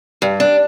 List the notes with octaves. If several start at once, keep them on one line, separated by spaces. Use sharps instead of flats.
G2
D4